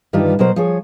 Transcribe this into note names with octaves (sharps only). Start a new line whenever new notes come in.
G2 D#3 E3 G3 F4
B2 F#3 A#4 C5
F3 G#4 C#5